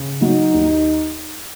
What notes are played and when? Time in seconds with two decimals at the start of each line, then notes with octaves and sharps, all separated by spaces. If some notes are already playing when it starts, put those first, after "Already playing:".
Already playing: C#3
0.22 F#3 D#4
0.54 D#2